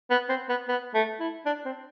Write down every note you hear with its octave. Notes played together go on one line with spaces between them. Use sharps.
B3
C4
B3
B3
A3
E4
D4
C4